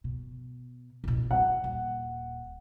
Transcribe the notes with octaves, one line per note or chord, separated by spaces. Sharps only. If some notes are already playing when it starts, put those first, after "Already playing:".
B2
A1 B2
G3 F#5
D#1